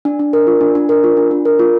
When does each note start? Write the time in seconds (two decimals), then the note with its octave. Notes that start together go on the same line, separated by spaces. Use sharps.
0.05 D4
0.19 D4
0.33 A#4
0.47 F4
0.61 D4
0.75 D4
0.89 A#4
1.04 F4
1.17 D4
1.31 D4
1.45 A#4
1.59 F4